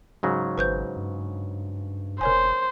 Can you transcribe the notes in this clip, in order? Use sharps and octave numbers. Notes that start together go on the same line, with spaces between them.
G#2 C#3 F#3
G#1 B4 C5 G6
G2
E1 A#4 C5 C#5 G#5